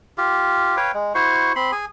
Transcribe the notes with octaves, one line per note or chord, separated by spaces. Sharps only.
F4 G4
B4 C#5 F5 G5
G#3
E4 F#4 C5 C#6
C4 B5 C6
G#4 G#5